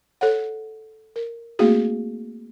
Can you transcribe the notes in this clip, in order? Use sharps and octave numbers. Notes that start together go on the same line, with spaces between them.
A4 C#5 F#5
A#4
A3 A#3 C4 D#4 F#4 G#4